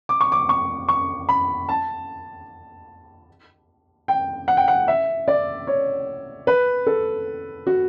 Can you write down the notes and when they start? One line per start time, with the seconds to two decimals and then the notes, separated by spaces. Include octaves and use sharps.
0.09 D6
0.21 C#6
0.32 D6
0.49 C#6
0.89 C#6
1.29 B5
1.69 A5
4.08 G5
4.48 F#5
4.57 G5
4.68 F#5
4.88 E5
5.28 D5
5.67 C#5
6.47 B4
6.87 A4
7.67 F#4